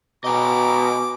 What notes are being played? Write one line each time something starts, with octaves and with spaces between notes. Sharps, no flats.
B2 D#5 G5 G#5 A#5 D6